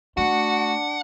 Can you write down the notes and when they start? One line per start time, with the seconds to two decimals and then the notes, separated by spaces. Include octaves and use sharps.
0.17 A3 D4 F#4 F#5